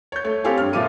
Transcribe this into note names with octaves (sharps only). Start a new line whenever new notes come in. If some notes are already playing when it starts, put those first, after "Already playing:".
C#5 G6
A3 C#5
C4 G4 A4 C#5 F5 G#5
G2 F6
A#2 F3 E5 F5 D6 D#7